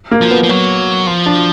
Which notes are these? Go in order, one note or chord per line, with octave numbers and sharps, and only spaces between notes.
A#3
F3
B3
F3
F#3
F3
D4